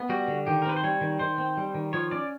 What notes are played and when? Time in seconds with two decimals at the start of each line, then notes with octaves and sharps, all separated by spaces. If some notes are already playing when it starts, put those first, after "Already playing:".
Already playing: B3
0.09 G3 F#4
0.28 D3
0.47 D#3 G4
0.62 A#4
0.66 C4 B4
0.76 C5
0.83 G3 C#5
1.01 D#3
1.19 D#3 C5
1.38 C4
1.57 G3
1.74 D#3
1.93 F3 C#5
2.11 C#4 D5